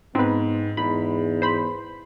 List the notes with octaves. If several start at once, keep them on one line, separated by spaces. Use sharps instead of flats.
G#2 B3 C4 B4
E2 G#2 B5
C5 B5